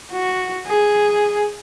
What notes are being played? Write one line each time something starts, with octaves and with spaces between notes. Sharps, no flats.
F#4
G#4